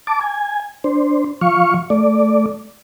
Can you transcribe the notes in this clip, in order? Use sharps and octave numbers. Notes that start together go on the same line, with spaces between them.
A5 D6
G#5
D4 C5
F3 F5 C#6
A3 D5